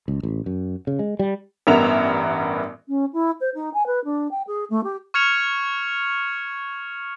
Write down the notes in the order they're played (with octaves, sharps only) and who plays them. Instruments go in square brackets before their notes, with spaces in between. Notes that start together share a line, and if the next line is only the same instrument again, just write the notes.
[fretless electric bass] C#2
A1
F#2
C#3
G#3
G3
[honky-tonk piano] A1 G2 B3 A#4 E5 F7
[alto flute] C#4
E4
C5
D#4
G#5
B4
D4
G5
G#4
A3
G4
[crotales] C#6 F6 G#6 C#7 F7